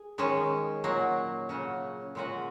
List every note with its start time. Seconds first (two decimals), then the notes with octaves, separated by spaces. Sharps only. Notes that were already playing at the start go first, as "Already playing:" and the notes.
Already playing: G#4
0.18 D#3 G#3 C#4
0.84 A#2 F#3 A#3
1.49 C#3 F#3 C#4
2.15 A#2 G#3 C#4 F#4